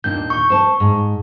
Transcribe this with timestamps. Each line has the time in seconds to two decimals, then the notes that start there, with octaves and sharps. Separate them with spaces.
0.04 D#2 A#2 D4 G6
0.30 C#6
0.50 C5 A5
0.80 G#2